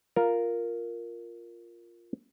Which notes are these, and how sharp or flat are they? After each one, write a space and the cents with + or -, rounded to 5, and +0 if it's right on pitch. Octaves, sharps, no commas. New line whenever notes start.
F4 +0 A#4 +0